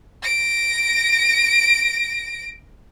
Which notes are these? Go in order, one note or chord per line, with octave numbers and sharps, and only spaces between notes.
A#6 D7